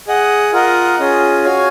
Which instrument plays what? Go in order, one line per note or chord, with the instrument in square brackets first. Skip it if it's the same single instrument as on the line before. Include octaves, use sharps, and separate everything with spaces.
[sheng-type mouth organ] G#4 D#5 F#5
F4 A#4 D#5 F#5
C#4 F4 G#4 D#5
F#4 C#5 F5 G#5